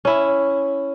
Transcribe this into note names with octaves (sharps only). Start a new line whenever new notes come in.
C#4 E4